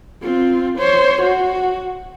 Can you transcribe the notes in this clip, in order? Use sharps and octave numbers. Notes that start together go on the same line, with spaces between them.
C4 F4
C5 C#5
F#4